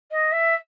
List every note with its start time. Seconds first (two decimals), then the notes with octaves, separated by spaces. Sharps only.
0.11 D#5
0.32 E5